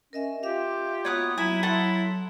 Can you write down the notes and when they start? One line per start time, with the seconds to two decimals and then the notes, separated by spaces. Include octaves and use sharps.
0.13 C#4 A#4 D#5 E5
0.43 F4 G4 E5 F5
1.05 A#3 B3 F#4 C#5 F#5 D#6
1.38 F#3 E4 G#5 A#5 B5
1.63 E4 A4 F#5 C6